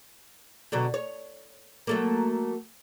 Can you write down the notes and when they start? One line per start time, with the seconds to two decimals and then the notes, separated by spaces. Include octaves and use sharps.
0.72 B2 D3 F#3
0.94 C#5
1.87 F#3 A3 A#3